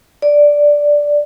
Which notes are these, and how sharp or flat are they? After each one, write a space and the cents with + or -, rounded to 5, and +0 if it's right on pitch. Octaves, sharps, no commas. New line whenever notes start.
D5 -5